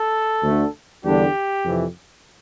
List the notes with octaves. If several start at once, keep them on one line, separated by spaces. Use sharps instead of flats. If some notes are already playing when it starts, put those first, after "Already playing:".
Already playing: A4
D2 D3 A3
E2 D3 G3 D4 G4
F2 C3 E3